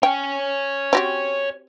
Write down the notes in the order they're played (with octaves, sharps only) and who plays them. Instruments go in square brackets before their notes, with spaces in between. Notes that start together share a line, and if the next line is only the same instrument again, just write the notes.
[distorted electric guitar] C#5 G#5 [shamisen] G5
[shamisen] C4 F#4 G4